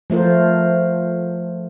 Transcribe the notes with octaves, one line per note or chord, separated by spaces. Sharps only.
F3 A3 F4 A#4 C5